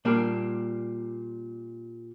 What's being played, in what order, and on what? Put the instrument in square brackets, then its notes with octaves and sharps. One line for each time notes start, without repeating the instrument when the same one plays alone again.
[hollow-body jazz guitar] A#2 G3 A#3 D4